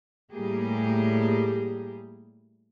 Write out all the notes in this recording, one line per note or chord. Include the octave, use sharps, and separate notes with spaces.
A2 G3 A#3 G4 G#4